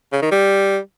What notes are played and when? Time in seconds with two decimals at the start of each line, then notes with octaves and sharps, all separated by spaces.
0.12 C#3
0.22 D#3
0.31 G3